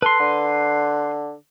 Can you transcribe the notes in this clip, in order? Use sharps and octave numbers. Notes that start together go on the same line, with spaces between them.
A4 B4 C6
D3